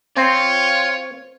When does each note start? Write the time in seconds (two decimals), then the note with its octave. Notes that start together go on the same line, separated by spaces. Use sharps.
0.17 C4 F4 C#5